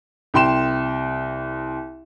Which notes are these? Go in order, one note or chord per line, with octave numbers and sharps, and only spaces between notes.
C2 G5 C6 E7